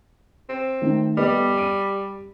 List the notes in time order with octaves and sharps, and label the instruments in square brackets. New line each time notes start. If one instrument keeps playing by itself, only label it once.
[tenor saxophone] C4
[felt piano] D#3 A3
[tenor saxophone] G3 [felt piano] B3 A4 D#5
[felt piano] D7 D#7